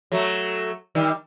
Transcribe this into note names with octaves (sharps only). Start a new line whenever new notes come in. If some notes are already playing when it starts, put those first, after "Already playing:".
F#3 A3
D#3 G3